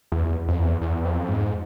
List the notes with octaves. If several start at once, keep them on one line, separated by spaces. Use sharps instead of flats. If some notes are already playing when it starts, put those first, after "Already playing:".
E2
F2
E2
E2
F2
G#2